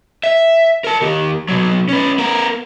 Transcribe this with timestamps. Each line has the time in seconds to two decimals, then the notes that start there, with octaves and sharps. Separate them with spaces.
0.24 E5
0.84 A#4 A5
1.01 D#2 G4
1.49 B2 F#3
1.89 C#4 B4
2.18 B3 A#4